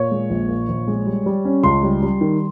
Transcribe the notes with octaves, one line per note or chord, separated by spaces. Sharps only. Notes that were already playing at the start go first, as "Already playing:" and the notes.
Already playing: A#2 C#5
G#3
A#1
A#2
A#1
G#3
G3
G3
C#4
C#2 C6
G3
G3
D#3